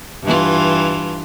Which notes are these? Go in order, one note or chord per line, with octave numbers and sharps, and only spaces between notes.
G2 E3 F4